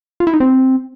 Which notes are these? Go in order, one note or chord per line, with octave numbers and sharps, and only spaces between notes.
F4
E4
D#4
C4